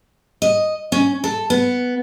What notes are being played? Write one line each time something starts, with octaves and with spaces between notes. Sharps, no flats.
D#5
C#4
A4
B3